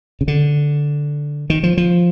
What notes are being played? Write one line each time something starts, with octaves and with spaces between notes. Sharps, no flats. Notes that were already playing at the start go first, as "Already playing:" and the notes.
C#3
D3
D#3
F3
F3